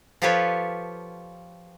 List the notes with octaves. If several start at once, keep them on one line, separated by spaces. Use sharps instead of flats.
F3 F4 G4 A4 B4 C#5